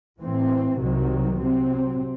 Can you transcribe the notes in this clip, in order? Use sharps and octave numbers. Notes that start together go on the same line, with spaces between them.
A2 E3 C4
C2 C3 D#3 F#3
C3 F#3 C4